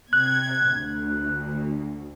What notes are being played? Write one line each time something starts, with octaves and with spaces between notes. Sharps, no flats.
C3 F#6 G#6
D2